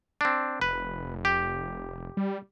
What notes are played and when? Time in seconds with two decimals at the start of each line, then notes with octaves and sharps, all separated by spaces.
0.21 C4 D4
0.61 F1 B4
1.25 G4
2.17 G3